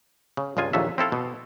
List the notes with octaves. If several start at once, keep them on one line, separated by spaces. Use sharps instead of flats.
C#3
C#2 G2 G#3 F4 G#5
A#1 D#2 A#2 F#3 A4 E5
C4 E4 A4 F5
B2